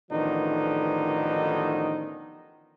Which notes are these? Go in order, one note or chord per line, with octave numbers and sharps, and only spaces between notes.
A1 D3 D#3 F3 B3 D#4